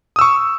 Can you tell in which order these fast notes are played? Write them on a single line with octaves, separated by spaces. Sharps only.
D#6 E6 C#6